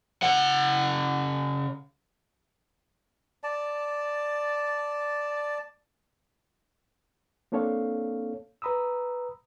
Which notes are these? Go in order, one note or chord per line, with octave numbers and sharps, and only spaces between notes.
C#3 F#5
D5 A5
A#3 C4 D4 A4 C#5 F5
B4 A#5 B5 D#6 E6